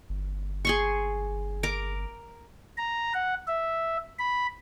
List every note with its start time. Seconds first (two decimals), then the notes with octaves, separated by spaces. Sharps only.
0.09 G1
0.65 G#4 C6 C#6
1.63 A#4 D6
2.77 A#5
3.14 F#5
3.47 E5
4.19 B5